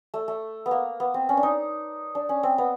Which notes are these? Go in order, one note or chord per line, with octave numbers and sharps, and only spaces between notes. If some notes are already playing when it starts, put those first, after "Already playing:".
A3
A3
B3
A#3
B3
C4
C#4
D4
D#4
D4
C#4
C4
B3